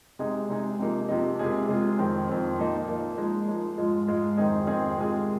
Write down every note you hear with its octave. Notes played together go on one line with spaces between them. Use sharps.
C3 G#3 D#4 G#4
C3 G#3 D#4 G#4
C3 F3 A#3 D#4
C3 F3 A#3 D#4
C3 G#3 F4 G#4
C3 G#3 F4 G#4
F2 D#3 C4
F2 D#3 C4
A#2 F3 A#3 D#4
A#2 F3 A#3 D#4
F3 G#3 D#4
F3 G#3 D#4
G#2 F3 G#3 F4
G#2 F3 G#3 F4
F2 D#3 C4 D#4 G#4
F2 D#3 C4 D#4 G#4
C3 G#3 F4 G#4